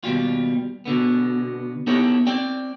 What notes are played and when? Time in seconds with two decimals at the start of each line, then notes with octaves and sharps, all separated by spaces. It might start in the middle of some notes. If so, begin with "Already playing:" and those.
0.04 D#2 B2 G3 F4
0.85 B2 D3 B3
1.87 B3 D#4 E4 G4 A4 C#5
2.27 C4 D5 G5